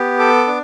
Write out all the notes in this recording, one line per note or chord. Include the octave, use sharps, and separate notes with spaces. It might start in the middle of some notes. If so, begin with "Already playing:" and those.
Already playing: B3 G4
A4 D6
D4